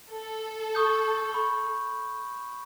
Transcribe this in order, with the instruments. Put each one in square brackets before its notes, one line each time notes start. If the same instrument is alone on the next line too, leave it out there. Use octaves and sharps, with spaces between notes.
[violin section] A4
[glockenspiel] C#6 D#6 G6
B5 C#6